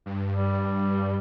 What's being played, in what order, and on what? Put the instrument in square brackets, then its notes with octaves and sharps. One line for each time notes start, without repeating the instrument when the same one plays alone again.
[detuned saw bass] G2
[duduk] G3